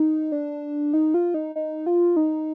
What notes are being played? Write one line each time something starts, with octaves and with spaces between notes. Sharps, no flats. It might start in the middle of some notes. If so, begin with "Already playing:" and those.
Already playing: D#4
D4
D#4
F4
D#4
D#4
F4
D#4